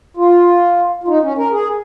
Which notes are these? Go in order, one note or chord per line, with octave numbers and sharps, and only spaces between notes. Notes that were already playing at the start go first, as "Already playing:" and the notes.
F4
F4
D#4
C#4
A#4
G#4